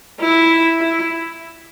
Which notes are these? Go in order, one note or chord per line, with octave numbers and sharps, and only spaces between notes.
E4
E4